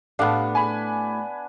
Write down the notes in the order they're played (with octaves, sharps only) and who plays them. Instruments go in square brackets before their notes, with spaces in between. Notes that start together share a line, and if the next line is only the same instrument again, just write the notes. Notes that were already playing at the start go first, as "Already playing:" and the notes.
[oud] A2 G4 A4 [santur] B3 D4 [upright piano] F5
[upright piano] G#5 B5